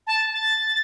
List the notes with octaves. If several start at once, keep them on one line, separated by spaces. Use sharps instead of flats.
A5
A6